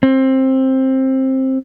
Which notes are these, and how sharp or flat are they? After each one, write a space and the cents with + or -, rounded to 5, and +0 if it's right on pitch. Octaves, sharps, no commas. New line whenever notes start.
C4 +15